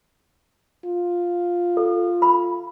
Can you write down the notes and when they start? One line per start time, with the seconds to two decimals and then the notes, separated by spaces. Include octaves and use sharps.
0.85 F4
1.77 A4
2.22 B5